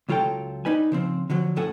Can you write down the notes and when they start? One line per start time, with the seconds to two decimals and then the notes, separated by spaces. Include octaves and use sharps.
0.09 C#2 F#3 F4 A4 G5
0.65 D4 D#4 B4 G#5
0.92 C#3 F3 C4
1.30 D3 F3 F#3
1.56 F#2 A2 A4 F#5 G#5